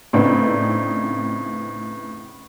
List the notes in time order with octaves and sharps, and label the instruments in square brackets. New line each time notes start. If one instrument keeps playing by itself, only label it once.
[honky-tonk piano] A2 C#3 B3 C4 D4 D#4